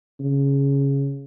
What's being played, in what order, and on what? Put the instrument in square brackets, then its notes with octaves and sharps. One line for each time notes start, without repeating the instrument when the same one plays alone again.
[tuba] C#3